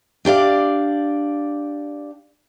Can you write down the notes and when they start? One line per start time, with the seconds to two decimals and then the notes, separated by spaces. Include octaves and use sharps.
0.25 D4 G4 D5 F5